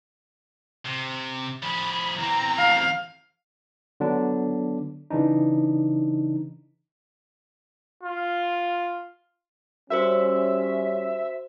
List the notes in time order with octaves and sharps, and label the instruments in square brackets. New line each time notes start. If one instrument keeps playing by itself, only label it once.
[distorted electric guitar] C3
[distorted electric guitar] F3 G#4 [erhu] B5
[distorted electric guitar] E2 C4 [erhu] A#5
[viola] F5
[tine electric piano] D3 F#3 B3 D4
C#3 E3 D4 D#4
[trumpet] F4
[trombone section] G3 C#4 [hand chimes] F#4 A#4 C5 [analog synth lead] E5